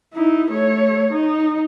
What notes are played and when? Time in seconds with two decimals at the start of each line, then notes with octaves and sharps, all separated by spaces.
0.14 D#4 E4
0.51 A3 C#5
1.11 D#4